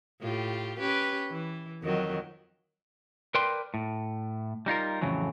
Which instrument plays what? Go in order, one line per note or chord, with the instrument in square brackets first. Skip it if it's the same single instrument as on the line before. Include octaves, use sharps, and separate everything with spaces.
[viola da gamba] A2 F4 G4
C#4 G4 B4
E3
F2 D#3 F#3
[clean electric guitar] A#4 B4 D5 G5 C6
A2
G3 D#4 F4 A#4
F2 A2 C#3 E3 F#3